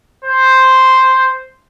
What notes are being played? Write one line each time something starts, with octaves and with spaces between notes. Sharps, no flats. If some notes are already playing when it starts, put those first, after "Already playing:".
C5